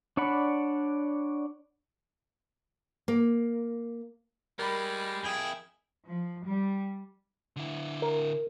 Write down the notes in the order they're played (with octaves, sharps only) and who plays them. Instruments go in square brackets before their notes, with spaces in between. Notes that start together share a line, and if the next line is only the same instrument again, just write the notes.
[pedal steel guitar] D4 C#5 D5 F#5 B5
[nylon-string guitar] A#3
[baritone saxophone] G3 [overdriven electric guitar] G#3 [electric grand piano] A#4 B5
[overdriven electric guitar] F2 E4 [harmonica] G#4 G5
[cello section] F3
G3
[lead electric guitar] D3 E4
[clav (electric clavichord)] A#4